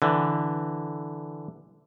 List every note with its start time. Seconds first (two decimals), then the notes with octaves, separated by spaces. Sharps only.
0.02 D3 E3